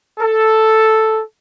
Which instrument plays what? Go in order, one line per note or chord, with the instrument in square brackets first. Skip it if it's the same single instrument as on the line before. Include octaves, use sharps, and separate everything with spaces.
[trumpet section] A4